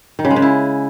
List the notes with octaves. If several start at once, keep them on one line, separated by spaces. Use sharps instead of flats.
D#3
C#3
G#3
C#3
E4